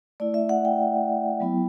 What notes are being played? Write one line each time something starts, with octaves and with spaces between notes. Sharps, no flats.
A3 E4 D5
E5
F#5
G5
F#3 B3 E4